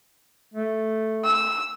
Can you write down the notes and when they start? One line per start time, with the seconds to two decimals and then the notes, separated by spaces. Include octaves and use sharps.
0.54 A3
1.24 E6